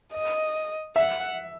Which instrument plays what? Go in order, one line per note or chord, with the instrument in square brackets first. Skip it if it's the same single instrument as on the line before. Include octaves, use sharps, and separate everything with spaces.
[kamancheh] D#5
[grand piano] E5 [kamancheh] F#5